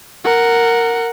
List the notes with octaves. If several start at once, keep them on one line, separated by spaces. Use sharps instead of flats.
A#4 F#5